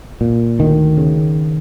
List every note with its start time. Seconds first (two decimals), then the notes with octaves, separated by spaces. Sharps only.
0.21 A#2
0.59 D2 D#3
0.97 C#3